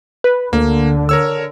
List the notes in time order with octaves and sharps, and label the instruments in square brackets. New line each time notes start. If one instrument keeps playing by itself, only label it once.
[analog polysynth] B4
[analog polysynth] D2 [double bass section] D3 [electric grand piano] A#3
[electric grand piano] A#4 C#5 E6